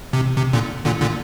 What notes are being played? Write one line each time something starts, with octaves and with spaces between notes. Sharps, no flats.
C3
C3
A#2 D3
A#2 D3
A#2 D3